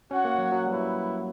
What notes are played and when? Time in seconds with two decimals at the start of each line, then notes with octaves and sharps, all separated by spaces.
0.11 C#4 F#4 C#5 F#5
0.25 A#3
0.38 F#3
0.52 F#3
0.66 G3 E4 B4 F#5